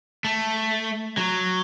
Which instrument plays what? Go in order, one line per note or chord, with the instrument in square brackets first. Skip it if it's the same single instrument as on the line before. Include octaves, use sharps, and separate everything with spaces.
[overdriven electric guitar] A3
F#3